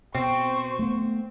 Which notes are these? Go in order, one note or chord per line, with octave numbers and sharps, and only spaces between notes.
B2 C4 C5 C#6
A3 B3